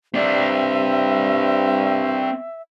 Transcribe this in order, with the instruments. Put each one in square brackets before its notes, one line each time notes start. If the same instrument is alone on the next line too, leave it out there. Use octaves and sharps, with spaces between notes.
[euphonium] G2 [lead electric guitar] C4 D5 [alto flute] E5